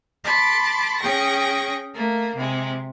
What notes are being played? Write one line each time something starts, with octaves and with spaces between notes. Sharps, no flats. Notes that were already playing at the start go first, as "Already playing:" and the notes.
A5 B5 C6 D6
C#4 G#4 G5 C#6 A#6
A3 A#3
C3 G#3